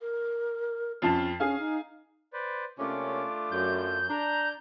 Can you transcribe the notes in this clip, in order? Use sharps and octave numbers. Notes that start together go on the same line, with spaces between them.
A#4
F2 C#4 F4 A5
C#4 G#4 F5
D#4
B4 C5 D5
C3 A3 A#3 C#4 D4 F4 D6
F#2 G6
D4 A#5